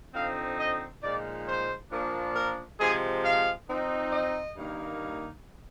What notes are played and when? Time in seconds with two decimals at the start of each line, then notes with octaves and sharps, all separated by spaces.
0.13 D3 F3 C4 D#4 F5
0.58 D#5
1.02 A#2 F3 G#3 D#4 D5
1.47 C5
1.91 A#2 F3 A#3 D4
2.35 A#4
2.79 C3 F3 G#3 G#4
3.23 F5
3.69 F3 C4 D#4
4.12 D#5
4.56 G2 D#3 A#3 D#4